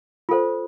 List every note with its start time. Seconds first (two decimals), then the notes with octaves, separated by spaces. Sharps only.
0.29 F4 A4 C5